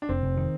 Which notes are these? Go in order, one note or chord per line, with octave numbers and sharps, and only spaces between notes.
D4
F1 C4
F1
D#3